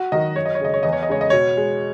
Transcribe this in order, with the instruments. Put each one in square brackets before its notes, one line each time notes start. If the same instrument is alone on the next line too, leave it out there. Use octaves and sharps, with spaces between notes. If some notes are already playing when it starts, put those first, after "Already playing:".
Already playing: [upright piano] F#4
D#3 F#3 D#5
F#2 C#5
D#5
C#5
C#3 G#3 D#5
C#5
E2 D#5
C#5
D#5
C#3 G#3 C#5
D#5
B2 C#5
G#3